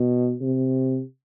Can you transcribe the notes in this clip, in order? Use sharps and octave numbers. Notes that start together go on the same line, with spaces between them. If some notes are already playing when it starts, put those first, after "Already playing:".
Already playing: B2
C3